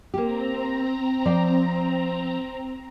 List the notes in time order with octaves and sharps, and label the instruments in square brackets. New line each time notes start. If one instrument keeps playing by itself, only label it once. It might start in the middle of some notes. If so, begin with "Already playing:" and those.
[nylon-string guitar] A#3 G4 [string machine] C4 A#5
[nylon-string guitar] F3 C5 D5